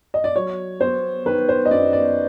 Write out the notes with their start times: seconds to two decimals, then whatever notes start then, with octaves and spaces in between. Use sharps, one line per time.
0.14 D#5
0.24 D5
0.36 F#3 C#5
0.80 B3 C5
1.26 D#3 B4
1.49 C5
1.65 D#5
1.71 F#2 D5
1.93 D5